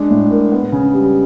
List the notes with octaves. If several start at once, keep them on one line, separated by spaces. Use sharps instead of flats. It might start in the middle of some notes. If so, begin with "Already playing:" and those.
Already playing: G#3 D4
A2
A#3
B3
C#3
G3